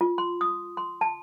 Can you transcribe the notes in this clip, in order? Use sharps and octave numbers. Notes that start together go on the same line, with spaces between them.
F4
C6
D#6
C6
A5